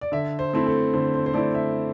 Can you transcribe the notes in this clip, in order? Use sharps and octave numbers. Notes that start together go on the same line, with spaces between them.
D5
D3 E5
C5
A3 C4 E4
A4
D3 C5
C5
C5
A3 C4 E4 D5
E5